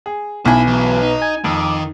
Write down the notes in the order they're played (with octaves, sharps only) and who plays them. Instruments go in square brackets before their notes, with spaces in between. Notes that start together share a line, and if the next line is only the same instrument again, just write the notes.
[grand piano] G#4
[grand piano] B1 G#5 [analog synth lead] B3 [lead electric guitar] E4
[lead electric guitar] E3 F#3
D#4
[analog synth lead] G#5
[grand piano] F2 [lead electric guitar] D#3 [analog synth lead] D6